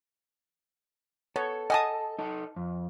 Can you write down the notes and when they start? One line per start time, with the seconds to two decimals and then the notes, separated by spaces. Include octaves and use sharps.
1.36 B3 A4 C#5
1.70 D#5 F#5 G#5 A5 D#6
2.19 D#4 A4
2.56 F2